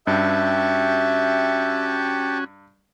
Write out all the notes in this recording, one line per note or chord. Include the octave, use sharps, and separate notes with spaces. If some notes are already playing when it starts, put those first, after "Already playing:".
G2 C#4 F#4 G4 E5 G5 A5